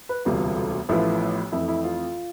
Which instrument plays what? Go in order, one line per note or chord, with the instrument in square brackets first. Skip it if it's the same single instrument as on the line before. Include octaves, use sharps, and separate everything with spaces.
[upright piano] B4
E1 D2 C3 G3 B3 F4
A1 A2 F3 B3 E4
F2 E3 A3 E4
E4
F4